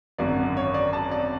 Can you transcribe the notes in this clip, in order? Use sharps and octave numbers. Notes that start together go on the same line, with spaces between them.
G#1 F#2 D3 D5
C#5
D5
A5
D5